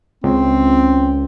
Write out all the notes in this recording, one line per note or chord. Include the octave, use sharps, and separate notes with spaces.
C#2 C4